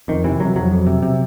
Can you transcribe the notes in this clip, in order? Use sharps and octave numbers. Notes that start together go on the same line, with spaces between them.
F2 D#3
C3 E3
C3 F#3
F2 F#3
F2
C3
C3